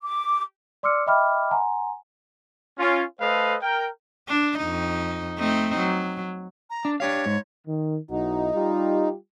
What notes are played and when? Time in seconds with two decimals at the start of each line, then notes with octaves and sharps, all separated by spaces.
0.03 D6
0.83 D5 C6 D6 E6 F6 C#7
1.07 D#5 E5 G5 B5 D6 F6
1.51 F#5 G#5 A#5 C6
2.79 C#4 F4
3.20 A3 A4 B4 C5 D#5 F5
3.62 A#4 G5
4.28 D4
4.59 F2 D#4
5.39 A3 C4 D#4
5.78 F#3
6.70 A#5
6.85 D4
7.00 D4 G4 C#5 F5
7.26 G#2
7.67 D#3
8.11 B1 D#4 E4 F#4
8.53 G3 F4 G4